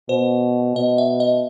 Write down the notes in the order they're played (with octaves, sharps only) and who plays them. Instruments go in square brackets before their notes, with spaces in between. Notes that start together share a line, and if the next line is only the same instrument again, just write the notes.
[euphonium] B2 [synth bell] C5
[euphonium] B2 [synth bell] D#5
[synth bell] E5
D#5